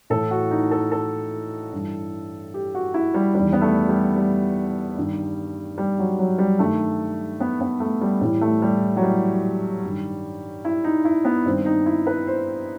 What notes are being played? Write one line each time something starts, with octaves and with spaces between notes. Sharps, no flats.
A2 E3 A4
F#4
D#4
A4
A4
G2 E3
G4
F#4
E4
G3
E2 D#3 G3
B3
A3
G3
G3
G2 D#3
G3
F#3
F#3
G3
G2 D#3 A3
B3
B3
A3
G3
A2 E3 G3
A3
G3
F#3
G3
G2 D#3
E4
D#4
E4
B3
G2 D#3 C4
D#4
E4
B4
C5